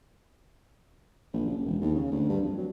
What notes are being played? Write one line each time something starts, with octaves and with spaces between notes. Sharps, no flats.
A#1
F#1
E1
D#2
C#3
D2
G2
F2
F#3